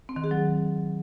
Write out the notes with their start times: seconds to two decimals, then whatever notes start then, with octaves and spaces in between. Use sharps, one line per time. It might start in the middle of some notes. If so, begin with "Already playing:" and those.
0.09 C4
0.16 D#3
0.24 G#4
0.31 F#3